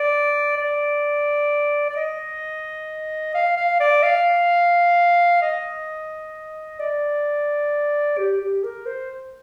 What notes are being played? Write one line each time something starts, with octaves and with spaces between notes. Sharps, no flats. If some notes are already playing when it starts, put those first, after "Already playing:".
Already playing: D5
D5
D5
D#5
F5
F5
D5
F5
D#5
D5
G4
G4
A#4
C5